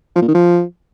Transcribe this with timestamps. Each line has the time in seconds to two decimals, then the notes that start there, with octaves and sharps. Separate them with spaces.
0.16 F3
0.22 A#2
0.28 D#3
0.35 F3